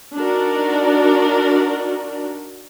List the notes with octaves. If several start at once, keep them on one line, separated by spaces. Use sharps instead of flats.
D4 D#4 F#4 A#4 D5